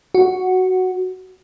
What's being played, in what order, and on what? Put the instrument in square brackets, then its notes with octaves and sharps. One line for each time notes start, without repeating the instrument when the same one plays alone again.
[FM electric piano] F#4